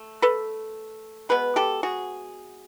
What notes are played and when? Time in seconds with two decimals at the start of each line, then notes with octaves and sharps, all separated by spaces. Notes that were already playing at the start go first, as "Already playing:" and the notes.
Already playing: A3
0.22 A4 B4
1.29 B2 G#3 B3 B4
1.56 G4 A4
1.83 F#4 G#4